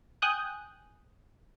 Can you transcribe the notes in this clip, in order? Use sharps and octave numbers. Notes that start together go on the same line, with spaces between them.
G5 G#5 D#6 F#6 G6